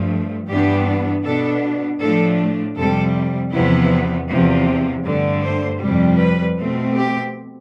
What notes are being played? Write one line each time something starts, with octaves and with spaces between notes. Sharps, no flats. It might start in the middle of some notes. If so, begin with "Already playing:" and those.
Already playing: G2 F3 A3
G2 E3 G3 B3 D4 G4
B2 B3 D4 A4
A2 F3 A3 D4 A4
F2 C3 G3 A4
E2 C3 F3 B3 E4
E2 C3 F3
G2 D3 A3
C5
F2 C3 G3
B4
B2 A3 C4
G4